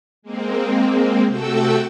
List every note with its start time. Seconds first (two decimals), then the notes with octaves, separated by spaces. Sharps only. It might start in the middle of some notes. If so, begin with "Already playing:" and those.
0.22 G#3 A#3 C4
1.26 C3 A3 F#4 A4 G5 E6